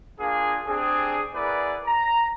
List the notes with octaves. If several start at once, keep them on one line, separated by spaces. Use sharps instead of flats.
A#3 D4 F4 G#4
C4 D4 G4 G#4
B3 E4 G#4 A#4 B4 D5
A#5